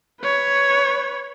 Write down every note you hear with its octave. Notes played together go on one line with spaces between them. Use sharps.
B4 C#5